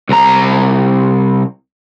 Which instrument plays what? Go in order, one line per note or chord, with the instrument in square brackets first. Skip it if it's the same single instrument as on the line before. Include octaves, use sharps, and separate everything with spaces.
[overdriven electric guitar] C2 A#5